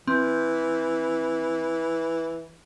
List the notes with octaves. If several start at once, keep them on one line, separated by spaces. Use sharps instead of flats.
E3 C4